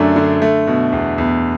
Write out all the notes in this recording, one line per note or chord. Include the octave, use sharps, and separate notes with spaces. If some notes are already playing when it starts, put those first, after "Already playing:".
Already playing: F#2 D3 A3 D4
D3
A3
B2
E2
E2